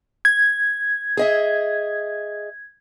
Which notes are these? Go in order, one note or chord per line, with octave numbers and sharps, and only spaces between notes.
G#6
G#4 D#5 E5